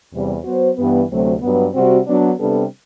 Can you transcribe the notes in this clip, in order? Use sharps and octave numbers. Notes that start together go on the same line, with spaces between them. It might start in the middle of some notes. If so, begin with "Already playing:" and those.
E2 C3 G3
F#3 B3 F#4 C5
G2 E3 G3 B3
D2 C3 F#3 A3 C4
G2 F#3 B3
C3 G3 C4 F#4
F#3 B3 D4
C3 G3 B3 D4 A4